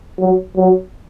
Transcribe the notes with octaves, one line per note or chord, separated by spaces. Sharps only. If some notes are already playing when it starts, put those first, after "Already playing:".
F#3
F#3